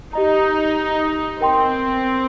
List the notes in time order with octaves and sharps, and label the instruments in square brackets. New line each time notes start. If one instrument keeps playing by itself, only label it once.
[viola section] D#4 [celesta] G4 D#5 A#5
[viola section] C4 [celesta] A#4 G5 C6